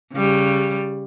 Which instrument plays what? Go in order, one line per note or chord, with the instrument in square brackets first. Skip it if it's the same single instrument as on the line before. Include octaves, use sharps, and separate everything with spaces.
[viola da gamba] C#3 G3